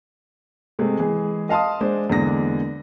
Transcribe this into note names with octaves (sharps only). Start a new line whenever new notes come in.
C3 G#3 A3
E3 G#3 G#4
D#5 F5 A5 C6 D#6
G#3 D4 C5
E2 D3 G#3 A#3 D4 A#6